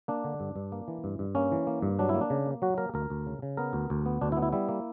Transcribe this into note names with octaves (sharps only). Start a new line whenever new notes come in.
A#3 D4
D3
G2
G2
A#3
E3
G2
G2
A#3 C#4
E3
A#3
G2
F#3 D4
E4
A#3
D4
C#3
A#3
F#3 F#4
A#3 A#4
D2 A#4
D2
C#3
C#3
B3 A#4
D2
D2
B3
D2 D4
E4
B3
E4
G3 E4
A#3